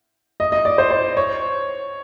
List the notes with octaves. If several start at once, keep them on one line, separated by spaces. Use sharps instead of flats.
D#5
D#5
D5
C5
C5
C#5